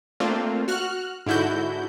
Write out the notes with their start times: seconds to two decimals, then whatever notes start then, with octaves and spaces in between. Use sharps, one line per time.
0.20 A3 A#3 C4 D4 F4
0.68 F#4 F6 F#6
1.26 G#2 D3 E4 F#4 G6